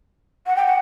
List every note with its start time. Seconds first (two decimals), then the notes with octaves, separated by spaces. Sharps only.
0.47 F#5
0.56 G5
0.66 F#5